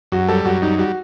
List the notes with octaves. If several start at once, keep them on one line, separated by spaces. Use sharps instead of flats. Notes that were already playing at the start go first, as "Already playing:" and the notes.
F#2 F#4
G3 A4
F#2 F#4
G3 D#4
G3 F#4